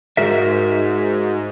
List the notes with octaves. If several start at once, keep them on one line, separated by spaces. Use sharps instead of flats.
G#2 F#4 A#4 E5